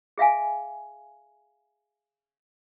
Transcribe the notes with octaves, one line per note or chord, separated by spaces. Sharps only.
G#4 E5 F5 G#5